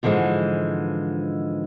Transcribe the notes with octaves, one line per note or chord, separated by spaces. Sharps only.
G#2 D3 E3 F3 G#3